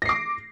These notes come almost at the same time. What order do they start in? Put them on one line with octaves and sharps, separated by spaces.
A#6 C7 D6